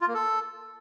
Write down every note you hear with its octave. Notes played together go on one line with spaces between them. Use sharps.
F4
A#3
A4